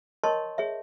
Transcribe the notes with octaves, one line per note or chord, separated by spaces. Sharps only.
A#4 C#5 D#5 A5 C6 C#6
G#4 C#5 E5